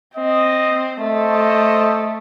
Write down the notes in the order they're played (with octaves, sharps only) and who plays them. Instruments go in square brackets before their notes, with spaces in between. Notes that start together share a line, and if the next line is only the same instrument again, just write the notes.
[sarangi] C4 [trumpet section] D#5
[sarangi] A3 [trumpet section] A4 C5 D#5